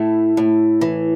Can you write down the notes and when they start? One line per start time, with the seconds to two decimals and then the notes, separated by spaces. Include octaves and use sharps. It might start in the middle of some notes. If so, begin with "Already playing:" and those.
Already playing: A2 A3 E4
0.37 A2
0.81 E3